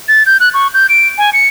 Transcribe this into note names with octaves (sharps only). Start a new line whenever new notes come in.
A6
G6
F#6
C#6
G6
D7
G#5
C#7